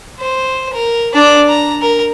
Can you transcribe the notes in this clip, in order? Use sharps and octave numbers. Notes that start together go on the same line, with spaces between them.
C5
A#4
D4 D5
A#5
A#4